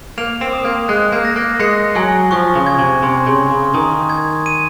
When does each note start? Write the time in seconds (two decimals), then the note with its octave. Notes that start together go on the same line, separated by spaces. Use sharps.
0.18 A#3 F7
0.41 C4
0.53 D#6
0.65 A#3
0.88 G#3 F#6
1.12 A#3
1.25 A#6
1.36 A#3
1.60 G#3 C#7
1.95 F#3 G#5
2.31 F3 C#6
2.55 C#3
2.67 G#6
2.79 C3
3.03 C3 C6
3.27 C#3
3.39 C6
3.50 C#3
3.74 D#3 D#6
4.09 G#6
4.46 D#7